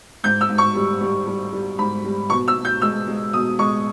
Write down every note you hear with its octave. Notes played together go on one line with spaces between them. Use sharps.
G#2 G6
E6
G#2
C#6
G3
G3
G3
G3
G#2 B5
G3
B2 C#6
E6
B2
G6
G#3 E6
G#3
B2 D#6
G#3 C#6